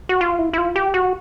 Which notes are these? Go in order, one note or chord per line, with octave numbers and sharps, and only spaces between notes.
F#4
F4
E4
E4
F4
G4
F#4